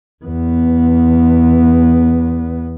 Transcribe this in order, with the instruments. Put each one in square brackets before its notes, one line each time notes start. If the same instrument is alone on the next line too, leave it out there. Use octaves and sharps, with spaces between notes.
[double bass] E2 B3